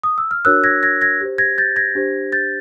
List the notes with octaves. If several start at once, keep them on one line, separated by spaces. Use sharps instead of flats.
D#6
E6
F6
D4 F#4 A#4 C#5 E6 F#6
G#6 A#6
G#6 A#6
G#6 A#6
G4 C5
G#6 A#6
G6 A6
G#6 A#6
D4 G4 C5
G6 A6